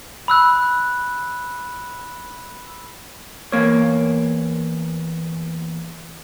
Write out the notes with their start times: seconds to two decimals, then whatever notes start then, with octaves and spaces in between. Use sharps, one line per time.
0.28 B5 E6 F#6
3.52 E2 A#3 C#5